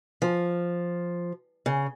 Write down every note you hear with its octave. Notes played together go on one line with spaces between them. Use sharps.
F3
C#3